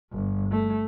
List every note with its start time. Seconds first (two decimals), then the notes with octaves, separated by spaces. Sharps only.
0.12 G1
0.51 A3